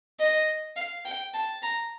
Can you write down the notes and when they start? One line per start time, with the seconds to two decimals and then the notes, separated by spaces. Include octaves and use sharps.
0.20 D#5
0.76 F5
1.05 G5
1.34 A5
1.62 A#5